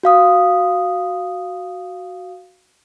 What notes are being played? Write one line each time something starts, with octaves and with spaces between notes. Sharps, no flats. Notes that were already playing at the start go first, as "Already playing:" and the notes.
F#4 F5 D#6